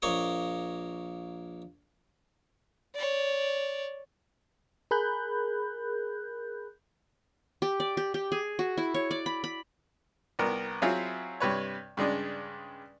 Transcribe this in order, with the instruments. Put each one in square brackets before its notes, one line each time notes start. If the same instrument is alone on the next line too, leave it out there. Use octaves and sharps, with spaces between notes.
[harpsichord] A#1 A#3 C#5 D#5 D#6
[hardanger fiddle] C#5 D5
[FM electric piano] G#4 A#4 B5 F#6 G6
[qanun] G4
D5
G4
G4
G#4
F#4
E4
C#5
D5
B5
B5
[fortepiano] C2 B3 A#4
F#3 C4 E4 F4 G#4
G2 C3 B4 C#5
G2 C#3 G#3 D4